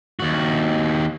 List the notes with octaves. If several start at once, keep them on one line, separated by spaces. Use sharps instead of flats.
D#2 F#4